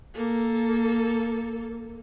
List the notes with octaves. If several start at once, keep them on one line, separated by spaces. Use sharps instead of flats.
A#3 A4